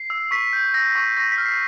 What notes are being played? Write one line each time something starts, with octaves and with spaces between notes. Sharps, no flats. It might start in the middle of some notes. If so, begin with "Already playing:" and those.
Already playing: C7
E6
C#6 B6
G6
E6 A#6
C#6
C#6 A#6
B6
F6
C7